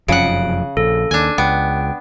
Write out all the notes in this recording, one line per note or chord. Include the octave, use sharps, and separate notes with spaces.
F1 F#2 C#3 F3 F#5 D7
A#1 A4
D#2 D4 G#5
C#2 B3 G5